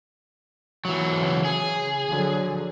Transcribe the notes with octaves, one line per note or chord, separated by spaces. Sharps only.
E3 F#3
C#3
G#4
D3 F3 F#3